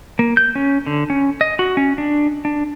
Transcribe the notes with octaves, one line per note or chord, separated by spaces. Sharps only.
A#3
G6
C#4
D3
C#4
D#5
F#4
C#4
D4
D4